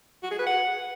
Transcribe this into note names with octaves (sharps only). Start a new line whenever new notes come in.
F#4
G#4
B4
F#5